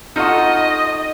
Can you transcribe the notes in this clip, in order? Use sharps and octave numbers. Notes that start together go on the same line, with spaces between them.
D#4 F4 F#4 A4 D#5 A5